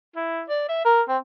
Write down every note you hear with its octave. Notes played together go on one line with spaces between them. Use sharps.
E4
D5
E5
A#4
C4